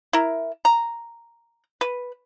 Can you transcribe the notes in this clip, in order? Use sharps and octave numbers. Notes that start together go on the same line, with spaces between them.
E4 A#4
A#5
B4